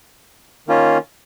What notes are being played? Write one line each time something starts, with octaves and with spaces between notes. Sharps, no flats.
D#3 A#3 C#4 F4